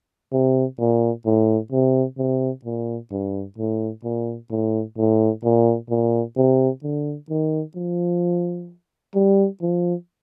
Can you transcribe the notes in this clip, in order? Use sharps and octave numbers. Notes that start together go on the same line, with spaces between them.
C3
A#2
A2
C3
C3
A#2
G2
A2
A#2
A2
A2
A#2
A#2
C3
D3
D#3
F3
G3
F3